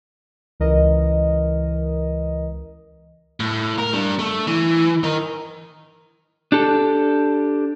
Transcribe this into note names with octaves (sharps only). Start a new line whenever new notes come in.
C#2 E3 A#4 D#5
A2
A#4
G3 D4
A3
E3
D#4 A#4
D4 G4 A4